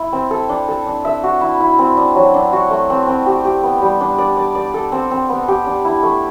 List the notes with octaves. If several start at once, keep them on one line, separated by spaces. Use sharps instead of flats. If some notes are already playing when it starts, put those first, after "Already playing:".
Already playing: E4
C4
A4
D4
A4
D4
E5
F#4
E4
E4
C4
D4
F#3
D4
F#4
A3
C4
C4
G4
G4
B3
G3
D4
D5
D5
D5
A4
C4
C4
B3
G4
D4
E4
A3